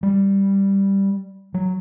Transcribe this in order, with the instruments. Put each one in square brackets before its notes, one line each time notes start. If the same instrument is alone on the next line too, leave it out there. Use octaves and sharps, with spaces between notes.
[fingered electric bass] G3
F#3